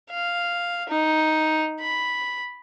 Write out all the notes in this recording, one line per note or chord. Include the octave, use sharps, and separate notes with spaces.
F5
D#4
B5